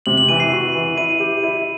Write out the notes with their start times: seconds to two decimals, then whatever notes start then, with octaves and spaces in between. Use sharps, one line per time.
0.06 C3 F#7
0.18 F#7
0.28 E3 D#7
0.40 C7
0.52 F#4
0.75 E3
0.97 E4 D#7
1.20 G4
1.43 E4